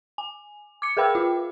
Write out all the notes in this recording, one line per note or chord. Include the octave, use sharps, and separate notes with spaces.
G#5
D6 C#7
G#4 A#4 B4 G5 B5 E6
F4